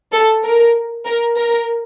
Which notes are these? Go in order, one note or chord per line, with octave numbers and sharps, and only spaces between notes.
A4
A#4
A#4
A#4